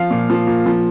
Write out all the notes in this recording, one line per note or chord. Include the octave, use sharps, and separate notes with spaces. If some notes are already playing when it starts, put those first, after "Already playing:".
Already playing: F3 F5
A#2
F3
A#2
F3